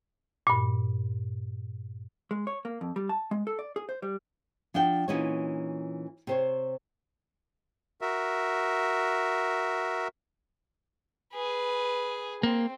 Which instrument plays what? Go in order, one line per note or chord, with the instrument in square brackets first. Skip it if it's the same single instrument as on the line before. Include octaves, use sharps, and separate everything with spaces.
[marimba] G2 A#2
[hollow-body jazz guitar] G#3
C#5
A#3
F2
G3
A5
G#3
A4
D5
G#4
C5
G3
[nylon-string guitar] F3 D4 F#5 G5
A#2 E3 C#4 D#4 F#4 C#5
C3 C5 C#5
[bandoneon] F#4 A#4 E5
[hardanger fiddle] G#4 B4
[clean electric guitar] A#3 [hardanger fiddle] C4